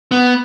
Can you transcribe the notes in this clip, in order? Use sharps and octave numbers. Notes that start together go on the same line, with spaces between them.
B3